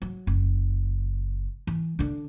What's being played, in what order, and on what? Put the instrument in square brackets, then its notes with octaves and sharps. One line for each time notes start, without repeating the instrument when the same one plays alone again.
[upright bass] F#3
F#1
E3
D3 D4